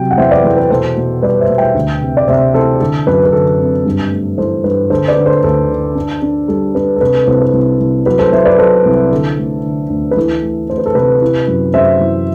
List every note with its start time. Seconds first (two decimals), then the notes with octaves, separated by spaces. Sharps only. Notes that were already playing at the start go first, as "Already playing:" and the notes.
Already playing: C3 F#3 G5
0.11 F#5
0.18 E2 C5 E5
0.31 B4 D5
0.44 E2 A4 C5
0.56 B4
0.70 B2 A4 C5
0.96 B2
1.22 G3 B4 D5
1.40 C5 E5
1.49 B2
1.58 E5 G5
1.75 D2
2.01 C3
2.17 D5
2.28 C3 C5 E5
2.54 E3 A4 C5
2.80 D3 A4
3.07 F#2 B4
3.25 B4
3.32 D3 A4
3.59 C4
3.85 G2
4.11 A3
4.38 E3 A4 C5
4.64 G2 B4
4.90 D3 A4 C5
5.08 B4 D5
5.17 D3
5.25 A4 C5
5.43 D2 A4
5.69 D3
5.95 D4
6.22 D4
6.48 G3 A4
6.75 D4 B4
6.96 A4
7.01 C3 B4
7.14 A4
7.27 C2 A4 C5
7.40 B4
7.53 C2
7.80 C2
8.06 F#3 B4
8.19 A4 C5
8.32 F#3 C5 E5
8.45 B4 D5
8.58 F#3 A4 C5
8.85 C2
9.11 D3 A4
9.38 A3
9.64 D3
9.90 D2
10.11 B4
10.16 E3 A4
10.42 A3
10.69 A3 C5
10.78 B4
10.86 A4
10.95 C3 B4
11.22 E4
11.48 F#2
11.74 F#2 C5 E5
12.01 E3